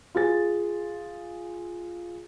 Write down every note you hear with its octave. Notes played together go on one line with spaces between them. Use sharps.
F4 G#4 A6